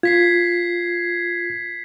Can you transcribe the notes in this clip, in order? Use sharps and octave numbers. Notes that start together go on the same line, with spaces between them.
F4 G#6 B6 C7